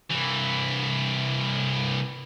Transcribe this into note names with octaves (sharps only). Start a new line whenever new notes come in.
C2 E3